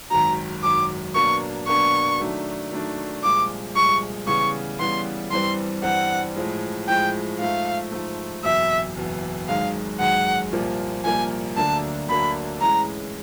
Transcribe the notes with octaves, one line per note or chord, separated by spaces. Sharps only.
G#1 F#2 D#3 F#3 A#5
G#1 F#2 D#3 F#3 D6
B2 F#3 A#3 D4 C#6
B2 F#3 A#3 D4 C#6
D#3 F#3 A3 D4
D#3 F#3 A3 D4
C2 A#2 F3 G#3 D6
C2 A#2 F3 G#3 C#6
C#3 E3 G3 B3 C#6
C#3 E3 G3 B3 C6
G2 E3 G3 C4 C6
G2 E3 G3 C4 F#5
A2 F3 G#3
A2 F3 G#3 G5
G#2 F3 A3 F5
G#2 F3 A3
F#1 E2 B2 E5
F#1 E2 B2
G#1 F#2 D#3 G#3 F5
G#1 F#2 D#3 G#3 F#5
C2 A#2 F3 A#3
C2 A#2 F3 A#3 G#5
D2 D3 F#3 A#3 D4 A5
D2 D3 F#3 A#3 D4 B5
A2 E3 G#3 C#4 A#5